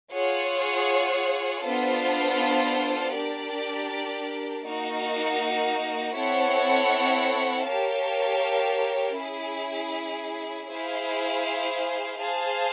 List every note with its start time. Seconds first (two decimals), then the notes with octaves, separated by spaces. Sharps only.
0.12 F4 G#4 C#5 F#5
1.63 B3 D4 F4 A4 C5
3.13 D4 G4 A#4 D5
4.64 A#3 D#4 F#4 A#4
6.15 C4 E4 A4 C#5 F#5
7.66 G4 A#4 C#5 F5 A5
9.16 C#4 E4 G#4
10.68 E4 G#4 C5 F5
12.18 G#4 C5 F5 A5